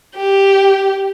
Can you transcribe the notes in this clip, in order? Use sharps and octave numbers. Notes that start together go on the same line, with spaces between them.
G4